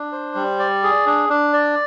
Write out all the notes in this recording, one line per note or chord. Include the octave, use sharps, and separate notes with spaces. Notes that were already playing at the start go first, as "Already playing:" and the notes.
Already playing: D4
C5
G3
D5
G#4
D4
D4
D5